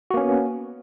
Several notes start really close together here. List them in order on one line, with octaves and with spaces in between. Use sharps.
F#4 A#3 C#4 B3